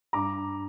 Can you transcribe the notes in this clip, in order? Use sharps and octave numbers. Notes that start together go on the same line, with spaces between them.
G2 A#5 D6